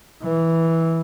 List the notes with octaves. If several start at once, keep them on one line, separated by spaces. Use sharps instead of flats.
E3